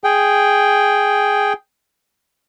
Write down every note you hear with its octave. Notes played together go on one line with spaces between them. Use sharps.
G#4 G5